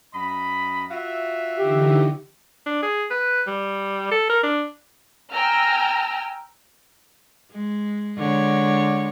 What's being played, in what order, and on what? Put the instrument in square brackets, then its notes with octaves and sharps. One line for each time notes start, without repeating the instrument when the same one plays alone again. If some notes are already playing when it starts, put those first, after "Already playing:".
[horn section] F#2 D#5 B5
F4 F#4 E5
[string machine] D3 E3 D#4 [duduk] G4
[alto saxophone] D4
G#4
B4
G3
A4
A#4
D4
[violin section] G5 G#5 A#5 E6 F6
[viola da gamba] G#3
D3 G#3 C#5